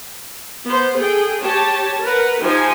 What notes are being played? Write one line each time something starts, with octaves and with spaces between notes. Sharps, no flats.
B3 C5
G#4 A4 G5
G4 C#5 A5
A#4 B4 F#5
F3 D#4 G4 C5 G#5